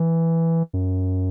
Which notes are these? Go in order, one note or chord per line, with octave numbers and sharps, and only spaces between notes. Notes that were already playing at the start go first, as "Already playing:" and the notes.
Already playing: E3
F#2